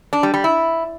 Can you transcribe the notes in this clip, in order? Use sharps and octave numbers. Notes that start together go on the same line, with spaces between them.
D4
G3
G3
E4